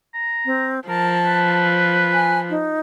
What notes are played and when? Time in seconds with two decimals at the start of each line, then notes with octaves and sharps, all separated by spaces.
0.14 A#5
0.46 C4
0.88 F3 A#4 A5
1.25 B4
2.14 G#5
2.50 D#4